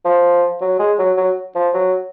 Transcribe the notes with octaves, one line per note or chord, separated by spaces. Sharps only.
F3
F#3
G#3
F#3
F#3
F3
F#3